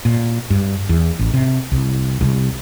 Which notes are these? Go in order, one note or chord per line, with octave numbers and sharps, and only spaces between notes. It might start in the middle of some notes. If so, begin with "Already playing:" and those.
A#2
G2
E2
A1
C3
C2
C2